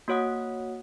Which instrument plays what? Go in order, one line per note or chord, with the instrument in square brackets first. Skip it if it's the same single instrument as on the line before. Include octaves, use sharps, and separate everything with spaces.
[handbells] A#3 F#4 C#5 F#5 D#6